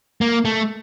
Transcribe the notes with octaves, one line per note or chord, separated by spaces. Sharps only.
A#3
A3